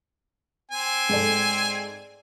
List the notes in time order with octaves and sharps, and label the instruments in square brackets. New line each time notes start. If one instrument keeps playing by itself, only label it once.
[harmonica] C4 G#5
[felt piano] G#2 A4 D5